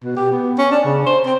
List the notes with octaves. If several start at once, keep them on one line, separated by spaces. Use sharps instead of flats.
B2
G4
B3
C#4
D4
C#3
C5
C4